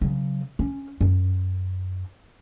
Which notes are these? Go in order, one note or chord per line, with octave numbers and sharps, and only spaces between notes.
C#3 F#3
C#4
F#2